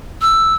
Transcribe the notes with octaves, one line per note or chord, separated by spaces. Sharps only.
E6